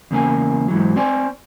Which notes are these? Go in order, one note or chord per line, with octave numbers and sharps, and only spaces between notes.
E2 C#3 A#3 G#5
G#2 E3 F#3
C4 D5 G#5